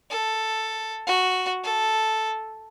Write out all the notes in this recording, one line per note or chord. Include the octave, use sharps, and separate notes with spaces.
A4
F#4
A4